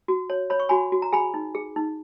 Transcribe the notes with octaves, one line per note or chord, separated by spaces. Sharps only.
F#4
C#5
C#5 B5
C#6
F#4 G#5 B5
F#4
A#5
G#4 G#5 B5
D#4
G#4
D#4